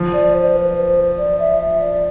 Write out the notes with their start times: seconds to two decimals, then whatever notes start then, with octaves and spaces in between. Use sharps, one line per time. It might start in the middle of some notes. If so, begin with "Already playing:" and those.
Already playing: F3
0.13 D5
0.34 C5
0.55 B4
0.76 C5
1.18 D5
1.39 E5
1.59 E5
1.80 D5